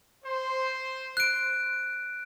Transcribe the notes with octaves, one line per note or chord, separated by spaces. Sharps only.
C5
F#6 D7